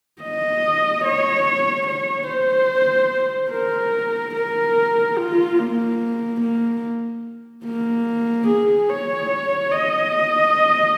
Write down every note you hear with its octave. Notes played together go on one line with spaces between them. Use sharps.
D#5
C#5
C#5
C5
A#4
A#4
F4
A#3
A#3
A#3
G#4
C#5
D#5